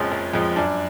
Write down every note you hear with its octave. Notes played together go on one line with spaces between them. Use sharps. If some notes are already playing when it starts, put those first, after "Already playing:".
Already playing: F#1 F2 F3 G#3 C#4
F#1
F2 F3 G#3
F#2 D4